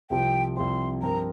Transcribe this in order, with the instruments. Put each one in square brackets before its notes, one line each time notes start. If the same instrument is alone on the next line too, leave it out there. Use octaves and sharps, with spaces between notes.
[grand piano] C2 C3 F3 C4 [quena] G5
[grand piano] C2 C3 F3 C4 [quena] C6
[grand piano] G2 F3 C4 F4 A#4 [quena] A#5